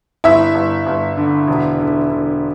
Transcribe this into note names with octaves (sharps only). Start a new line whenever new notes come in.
G1 E4 E5
G1
G1
D3
E1
D3
D3